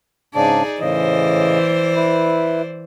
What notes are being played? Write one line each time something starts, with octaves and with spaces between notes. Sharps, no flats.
G#2 C#3 D4 D#4 G#4 D5
A2 C#3 E3 C5 D5 D#5
E4 B4